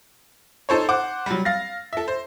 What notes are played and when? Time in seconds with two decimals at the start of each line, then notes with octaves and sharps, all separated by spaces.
0.69 D#4 A4 C5 C#5
0.89 C5 F#5 D6
1.26 F#3 G3
1.45 F5 A6 A#6
1.93 A4 E5
2.08 C5